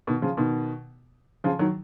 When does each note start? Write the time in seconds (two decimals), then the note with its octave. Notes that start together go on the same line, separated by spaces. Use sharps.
0.07 B2 D#3
0.22 C#3 F3
0.37 B2 D#3
1.44 C#3 F3
1.59 D#3 F#3